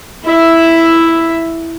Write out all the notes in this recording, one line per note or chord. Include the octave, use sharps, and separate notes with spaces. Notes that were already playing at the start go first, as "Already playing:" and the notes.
E4 E5